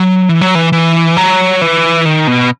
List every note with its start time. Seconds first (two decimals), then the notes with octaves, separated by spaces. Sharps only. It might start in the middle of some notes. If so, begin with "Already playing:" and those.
Already playing: F#3
0.29 E3
0.41 F#3
0.55 E3
0.72 E3
1.17 F#3
1.61 E3
2.05 D#3
2.27 B2